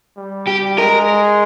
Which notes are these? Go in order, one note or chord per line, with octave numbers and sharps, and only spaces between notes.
G3
G4
G#3 A#4